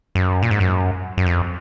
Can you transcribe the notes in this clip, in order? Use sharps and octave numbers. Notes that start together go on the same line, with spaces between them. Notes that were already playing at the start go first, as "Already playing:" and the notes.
F#2
A#2
G#2
F#2
F#2
F2